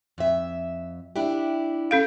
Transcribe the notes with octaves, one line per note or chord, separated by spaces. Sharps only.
F2 E5
D4 E4 G4
C#4 A4 F5